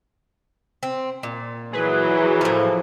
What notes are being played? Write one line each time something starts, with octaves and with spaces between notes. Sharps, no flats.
C4
A#2
E3 F#3 G#4 B4
A2 F3 A#3